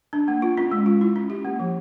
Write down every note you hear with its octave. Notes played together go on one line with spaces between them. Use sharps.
D4
A#3
F4
C#4
G#3
F4
E4
C#4
G4
A#3
F3